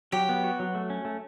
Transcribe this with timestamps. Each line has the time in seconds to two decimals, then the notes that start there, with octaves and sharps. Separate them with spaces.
0.12 F#3 G4
0.29 B3
0.44 F#4
0.60 F#3
0.75 A3
0.90 C#4
1.05 A3